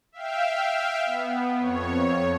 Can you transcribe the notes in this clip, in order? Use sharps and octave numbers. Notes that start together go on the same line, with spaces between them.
E5 F5 G5
B3
F2 C#5